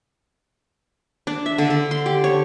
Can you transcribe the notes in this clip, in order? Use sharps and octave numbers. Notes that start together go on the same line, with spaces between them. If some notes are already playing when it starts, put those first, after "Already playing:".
D4
E5
D3
D3
C6
G4
C#5